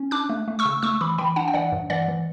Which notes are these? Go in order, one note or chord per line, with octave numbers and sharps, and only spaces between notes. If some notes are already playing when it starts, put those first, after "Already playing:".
Already playing: C#4
D4 D6 F#6
A3
A3
C#6 E6
C#3
A3 C#6 E6
E3 B5 D6
E3 G5 B5
D4 F#5 A5
G5
E3 D5 F#5
G2
E3 D5 F#5
E3